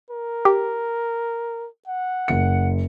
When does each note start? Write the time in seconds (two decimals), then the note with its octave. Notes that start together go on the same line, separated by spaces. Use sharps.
0.10 A#4
0.45 G4
1.88 F#5
2.28 F#1 C#7